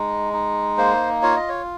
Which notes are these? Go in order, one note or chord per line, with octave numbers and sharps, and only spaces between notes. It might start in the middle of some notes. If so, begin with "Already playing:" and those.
Already playing: G#3 D#4
D#4
A#3 C5
F4 C#5
D#5
C#5